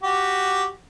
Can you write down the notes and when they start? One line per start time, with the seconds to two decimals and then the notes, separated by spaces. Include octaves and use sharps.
0.03 F#4 G4